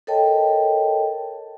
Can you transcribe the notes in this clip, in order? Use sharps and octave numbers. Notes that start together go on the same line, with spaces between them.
A4 A#4 C#5 D#5 G5 A5